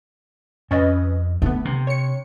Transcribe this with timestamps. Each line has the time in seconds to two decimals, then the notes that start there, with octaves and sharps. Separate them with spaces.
0.71 F2 C#4 B4 D#5
1.42 A3 B3 D4
1.65 C3
1.87 C#5 C#7